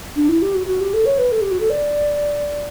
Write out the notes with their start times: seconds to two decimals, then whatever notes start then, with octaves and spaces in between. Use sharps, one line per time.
0.16 D4
0.29 E4
0.42 G4
0.55 F#4
0.67 F#4
0.81 G4
0.94 A4
1.06 C#5
1.18 B4
1.32 A4
1.41 G4
1.51 F#4
1.60 A4
1.70 D5